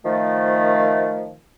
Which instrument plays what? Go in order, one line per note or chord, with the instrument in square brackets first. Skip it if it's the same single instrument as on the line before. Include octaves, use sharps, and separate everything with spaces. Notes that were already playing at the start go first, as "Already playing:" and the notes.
[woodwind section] D#3 F3 A3